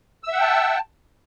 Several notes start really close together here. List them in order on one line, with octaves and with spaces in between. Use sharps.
E6 E5 F#5 G5 A5